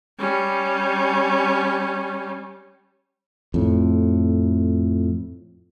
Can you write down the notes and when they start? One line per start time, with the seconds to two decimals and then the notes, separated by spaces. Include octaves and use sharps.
0.19 G3 C#4
3.54 F2 A2